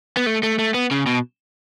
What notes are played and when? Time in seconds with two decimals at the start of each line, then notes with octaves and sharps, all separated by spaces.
0.17 B3
0.26 A3
0.43 A3
0.59 A3
0.74 B3
0.91 C#3
1.06 B2